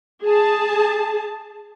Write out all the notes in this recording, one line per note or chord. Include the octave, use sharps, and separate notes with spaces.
G#4 A5